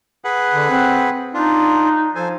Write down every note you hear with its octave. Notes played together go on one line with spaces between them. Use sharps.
G#4 B4 F#5
D3
C4
D4 D#4 F4
F3 A4 C5 G#5